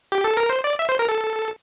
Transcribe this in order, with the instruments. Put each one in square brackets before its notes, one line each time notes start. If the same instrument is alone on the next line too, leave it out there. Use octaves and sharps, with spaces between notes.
[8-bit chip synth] G4
A4
A#4
C5
D5
E5
C5
A#4
A4